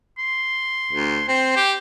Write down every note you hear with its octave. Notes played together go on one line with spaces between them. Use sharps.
C6
D2
C4 C5
G4